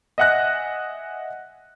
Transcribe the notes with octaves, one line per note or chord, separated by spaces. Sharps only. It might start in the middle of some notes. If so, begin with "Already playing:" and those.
D#5 E5 F#5 G#5 F#6 A#6